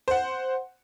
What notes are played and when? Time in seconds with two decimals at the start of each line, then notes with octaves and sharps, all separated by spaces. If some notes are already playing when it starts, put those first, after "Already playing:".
0.08 C5 F#5